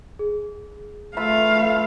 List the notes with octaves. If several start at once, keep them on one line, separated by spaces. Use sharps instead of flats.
G#4
A3 F4 B4 E5 F5